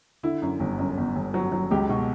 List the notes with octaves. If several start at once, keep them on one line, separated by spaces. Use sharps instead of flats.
D3 E4
F#2
G1
F#2
G1
G1
F#3
F#3
C#2 G4
B2